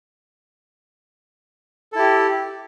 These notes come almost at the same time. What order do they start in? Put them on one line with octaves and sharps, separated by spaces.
A4 E4 G4